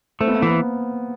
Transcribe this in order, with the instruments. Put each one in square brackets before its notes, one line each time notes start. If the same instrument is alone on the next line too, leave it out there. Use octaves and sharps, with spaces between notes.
[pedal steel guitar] A3 [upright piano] C4
[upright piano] B3
A#3
[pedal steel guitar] E3 [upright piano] B3